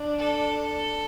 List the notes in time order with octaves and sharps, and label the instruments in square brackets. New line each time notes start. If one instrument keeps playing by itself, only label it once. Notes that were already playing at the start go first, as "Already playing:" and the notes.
Already playing: [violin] D4
[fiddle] A4